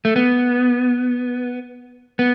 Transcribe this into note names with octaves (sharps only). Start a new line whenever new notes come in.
A3
B3
B3